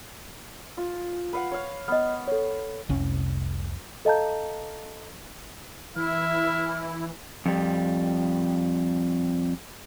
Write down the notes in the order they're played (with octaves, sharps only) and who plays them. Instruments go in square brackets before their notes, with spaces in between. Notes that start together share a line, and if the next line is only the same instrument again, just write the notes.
[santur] F4
B4 F5 F#5
C#5 F5
[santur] B3 [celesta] D#5 F6
[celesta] A4 C#5
[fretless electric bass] F1 C2 C#4
[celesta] A4 D#5 F5 A5 A#5 G6
[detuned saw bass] E3 [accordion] E4 [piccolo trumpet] E5 [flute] F6
[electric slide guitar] F2 G3